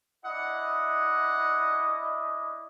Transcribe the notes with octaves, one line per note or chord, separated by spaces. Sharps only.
D4 E4 D#5 F#5